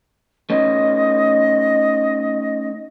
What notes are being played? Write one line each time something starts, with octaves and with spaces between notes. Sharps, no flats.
A3 C#4 D#4 D#5